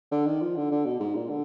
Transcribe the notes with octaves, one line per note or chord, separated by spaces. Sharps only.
D3
D#3
F3
D3
D3
B2
G#2
A#2
D3